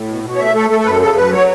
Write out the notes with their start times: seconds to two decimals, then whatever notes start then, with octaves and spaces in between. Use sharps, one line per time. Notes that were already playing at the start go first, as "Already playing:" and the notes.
Already playing: A2
0.08 B2
0.24 B2
0.35 C#5
0.39 A3 E5
0.54 A3 A4
0.70 A3 A4
0.80 A4
0.86 F#2 B4
0.91 A4
1.01 C#3 A4
1.16 F#2 B4
1.32 F#3 C#5